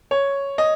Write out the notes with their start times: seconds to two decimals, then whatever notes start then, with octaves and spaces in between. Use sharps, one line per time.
0.11 C#5
0.58 D#5